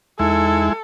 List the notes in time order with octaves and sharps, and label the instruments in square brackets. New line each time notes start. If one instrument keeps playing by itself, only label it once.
[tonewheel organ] E2 D#4 [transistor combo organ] G#3 E4 [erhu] A4